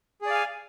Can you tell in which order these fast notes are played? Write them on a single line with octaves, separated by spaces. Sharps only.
G#4 D5 F5 G#5